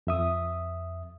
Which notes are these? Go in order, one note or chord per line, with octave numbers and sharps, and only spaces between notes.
F2 E5 D#6